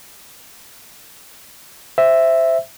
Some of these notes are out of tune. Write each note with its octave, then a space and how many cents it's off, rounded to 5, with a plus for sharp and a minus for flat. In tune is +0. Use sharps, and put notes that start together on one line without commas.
C5 +0 E5 +0